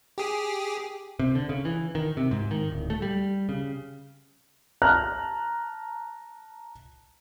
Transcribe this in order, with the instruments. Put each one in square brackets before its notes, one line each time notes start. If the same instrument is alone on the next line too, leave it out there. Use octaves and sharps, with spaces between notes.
[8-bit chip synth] G4 G#4
[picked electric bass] C3
D3
C#3
E3
D#3
C3
G#2
D#3
D1
A3
G3
C#3
[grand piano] A5 A#5 F6 F#6